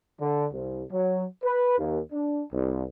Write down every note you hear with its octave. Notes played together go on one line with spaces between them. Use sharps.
D3
C2
F#3
B4
D#2
D4
C2